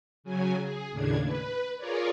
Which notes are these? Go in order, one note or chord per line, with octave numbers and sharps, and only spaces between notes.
C#3 F#3 G#5
G#4
D#2 A2 C#3 D4 G#6
B4
F4 G#4 A#4 C#5 D5